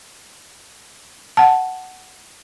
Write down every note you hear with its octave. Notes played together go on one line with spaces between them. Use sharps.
F#5 A5